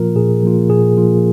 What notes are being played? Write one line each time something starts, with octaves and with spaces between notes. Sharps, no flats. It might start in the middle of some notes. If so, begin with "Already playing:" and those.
Already playing: A#2 F3 A#3 F4 A#4
A#2 G#4
F3 A#3 F4
A#2 G#4
F3 A#3 F4